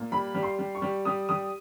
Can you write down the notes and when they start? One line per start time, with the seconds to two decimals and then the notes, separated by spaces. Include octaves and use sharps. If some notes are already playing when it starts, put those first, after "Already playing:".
Already playing: A#2
0.12 G3 B5
0.35 G3
0.43 C6
0.59 G3
0.75 C#6
0.82 G3
1.05 G3 D#6
1.29 G3 D#6